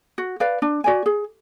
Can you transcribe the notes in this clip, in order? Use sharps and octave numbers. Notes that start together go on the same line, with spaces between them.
F#4
B4 D5 F5
D4
F#4 D5 G#5
G#4